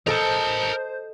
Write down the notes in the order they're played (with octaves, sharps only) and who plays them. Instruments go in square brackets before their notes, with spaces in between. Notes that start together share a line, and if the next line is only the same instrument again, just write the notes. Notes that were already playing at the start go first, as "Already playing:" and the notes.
[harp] A4 D#5 [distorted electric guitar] A#4 A5 [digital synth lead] C5